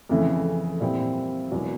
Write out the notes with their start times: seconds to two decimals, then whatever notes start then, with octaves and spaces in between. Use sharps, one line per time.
0.09 F2 C#3 E3 A3
0.80 A#2 G3 C4 E4
1.51 E1 E2 B2 F#3